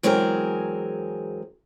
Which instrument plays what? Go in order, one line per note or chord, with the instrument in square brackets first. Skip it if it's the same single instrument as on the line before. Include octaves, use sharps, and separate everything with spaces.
[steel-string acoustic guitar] E2 F#3 G#3 C4 G#4 A#4